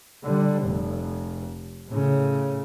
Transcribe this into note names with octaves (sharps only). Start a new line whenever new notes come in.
D3 G3
F1
A2 C#3